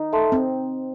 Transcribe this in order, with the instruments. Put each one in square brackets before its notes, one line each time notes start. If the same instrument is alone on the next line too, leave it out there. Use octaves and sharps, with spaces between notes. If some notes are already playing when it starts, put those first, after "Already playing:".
Already playing: [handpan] D#4
[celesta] A4 E5 A5 C6
[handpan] C4